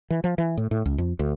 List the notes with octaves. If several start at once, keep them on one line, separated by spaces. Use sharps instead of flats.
E3
F3
E3
A2
A2
C#2
F2
D2